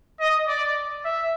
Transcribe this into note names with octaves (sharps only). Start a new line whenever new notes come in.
D#5
D5
E5